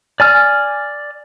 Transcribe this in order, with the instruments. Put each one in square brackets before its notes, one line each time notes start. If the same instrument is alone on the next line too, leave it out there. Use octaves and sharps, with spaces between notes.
[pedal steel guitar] D5 G#5 F6